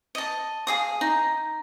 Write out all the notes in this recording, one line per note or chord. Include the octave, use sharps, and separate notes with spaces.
D#5 A5
G#4 F5 D#6
D#4